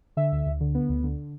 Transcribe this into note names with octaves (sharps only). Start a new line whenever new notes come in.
D3 E5
D2
D2
D3
B3
D2
D3